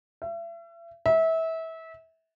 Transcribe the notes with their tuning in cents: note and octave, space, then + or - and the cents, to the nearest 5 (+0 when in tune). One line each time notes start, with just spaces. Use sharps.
E5 +40
E5 -25